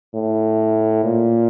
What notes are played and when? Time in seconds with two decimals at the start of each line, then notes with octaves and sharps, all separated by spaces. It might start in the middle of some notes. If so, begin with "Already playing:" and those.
0.15 A2
1.04 A#2